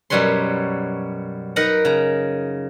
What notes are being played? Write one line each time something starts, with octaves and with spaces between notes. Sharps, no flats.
F#2 B2 G3 B4 C#5 C6
D#4 A#4 B4 F#5 A#5
C#3 A#5